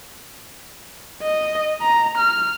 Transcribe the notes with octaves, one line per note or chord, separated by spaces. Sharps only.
D#5
A#5
F6